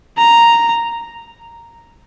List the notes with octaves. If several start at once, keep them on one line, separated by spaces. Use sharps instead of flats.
A#5